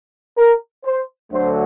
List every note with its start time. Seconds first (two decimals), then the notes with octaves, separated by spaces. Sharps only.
0.38 A#4
0.84 C5
1.32 D2 D3 F#3 A3 C5